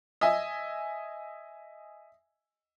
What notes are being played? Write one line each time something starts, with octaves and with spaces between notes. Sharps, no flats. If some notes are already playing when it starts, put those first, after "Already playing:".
D#5 E5 G#5